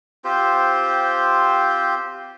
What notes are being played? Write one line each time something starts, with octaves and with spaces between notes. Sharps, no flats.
C4 F4 G4 C5